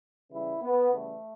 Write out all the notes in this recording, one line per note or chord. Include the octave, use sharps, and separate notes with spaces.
C#3 E3 G3 E4
B3
C#3 E3 G3 A3